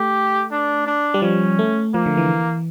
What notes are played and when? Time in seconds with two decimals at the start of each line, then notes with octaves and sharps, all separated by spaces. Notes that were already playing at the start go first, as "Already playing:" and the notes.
Already playing: A3 G4
0.51 D4
0.87 D4
1.14 G3
1.22 F3 C#4
1.59 A3
1.94 F3 A#3
2.06 D3
2.17 E3